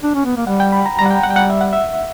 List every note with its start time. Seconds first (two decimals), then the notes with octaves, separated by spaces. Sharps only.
0.03 D4
0.15 C#4
0.25 B3
0.37 A#3
0.47 G3 F#5
0.60 G5
0.72 B5
0.86 A#5
0.99 G3 A#5
1.06 F#5
1.11 G5
1.24 G3 F#5
1.30 G5
1.36 F#5
1.50 E5
1.61 F#5
1.73 E5